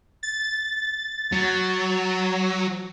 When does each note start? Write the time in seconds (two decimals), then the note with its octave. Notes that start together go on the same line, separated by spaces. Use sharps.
0.23 A6
1.32 F#3